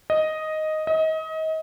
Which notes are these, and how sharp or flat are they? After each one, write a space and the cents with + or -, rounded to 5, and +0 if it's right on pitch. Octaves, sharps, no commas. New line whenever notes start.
D#5 +0
D#5 +30